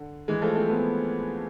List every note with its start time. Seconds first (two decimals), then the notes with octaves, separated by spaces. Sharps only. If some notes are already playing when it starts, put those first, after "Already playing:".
Already playing: D3
0.28 E3 G#3
0.42 F3 A3
0.55 A3 C4
0.69 G#3 B3